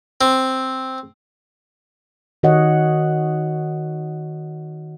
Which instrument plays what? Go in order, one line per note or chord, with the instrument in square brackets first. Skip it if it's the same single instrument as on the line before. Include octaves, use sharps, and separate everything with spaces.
[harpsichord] C4
[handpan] D#3 F#4 C#5 D#5 F#5